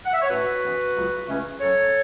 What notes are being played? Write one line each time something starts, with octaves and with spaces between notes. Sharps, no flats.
F#5
E5
C#5
A2 A3 C#4 F#4 B4
F#2 E3 B3
C#2 C#3 F#3 B3
C#2 C#3 A3 C#4
F#2 F#3 C#4 A4 C#5